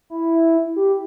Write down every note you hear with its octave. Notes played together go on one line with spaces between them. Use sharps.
E4
G4